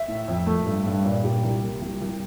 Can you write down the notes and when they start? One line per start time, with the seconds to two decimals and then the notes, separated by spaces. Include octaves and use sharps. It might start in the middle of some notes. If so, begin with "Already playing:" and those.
Already playing: E5
0.08 A2
0.28 F2
0.47 A3
0.66 G2
0.86 G2
1.05 A#2 D5
1.24 A#2 G4
1.43 C2
1.62 A#3
1.82 C2
2.01 C2